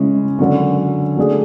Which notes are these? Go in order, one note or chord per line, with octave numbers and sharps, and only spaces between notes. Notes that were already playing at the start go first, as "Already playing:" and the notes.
Already playing: C#3 G#3 C#4 E4
D3 F#3 C#4
F#3 A3 D4 G#4